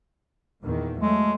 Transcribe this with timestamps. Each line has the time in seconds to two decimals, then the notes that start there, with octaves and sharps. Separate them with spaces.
0.62 E2 A#2 D#3
1.01 F#3 G#3 A3